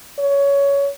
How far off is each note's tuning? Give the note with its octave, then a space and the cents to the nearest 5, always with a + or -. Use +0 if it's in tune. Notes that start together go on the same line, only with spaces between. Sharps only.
C#5 +15